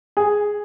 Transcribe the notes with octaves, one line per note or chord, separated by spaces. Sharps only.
G#4